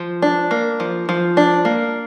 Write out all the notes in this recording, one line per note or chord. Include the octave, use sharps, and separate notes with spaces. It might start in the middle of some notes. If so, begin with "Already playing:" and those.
Already playing: F3
D4
A#3
F3
F3
D4
A#3